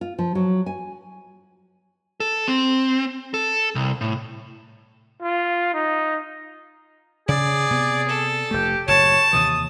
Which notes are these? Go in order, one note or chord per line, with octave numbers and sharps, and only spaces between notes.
F4
F3
F#3
G#5
A4
C4
A4
C2
A2
F4
D#4
C#3 G#4 D5
C3 B3
A4
F1 A3 G4
F#1 A2 C#5 A5
D#2 C3 E3 D#6